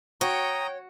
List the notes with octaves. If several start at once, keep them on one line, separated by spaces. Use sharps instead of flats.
F#4 C#5 G5 A#5 D#6